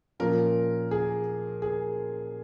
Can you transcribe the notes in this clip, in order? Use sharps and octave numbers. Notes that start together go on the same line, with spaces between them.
A#2 F3 A#3 C#4 A#4
G#4
G#4